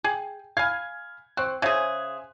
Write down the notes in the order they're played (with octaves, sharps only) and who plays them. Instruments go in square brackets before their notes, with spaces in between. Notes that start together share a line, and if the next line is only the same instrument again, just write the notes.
[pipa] G#4 [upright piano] G5
[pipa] F5 G#5 [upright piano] B5 F6 G#6
[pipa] C4 [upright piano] C5 C#6 F#6
[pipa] C#3 G#4 [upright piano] C5 E5 G#6